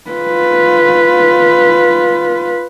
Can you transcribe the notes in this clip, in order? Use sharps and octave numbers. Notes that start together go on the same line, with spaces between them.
F4 B4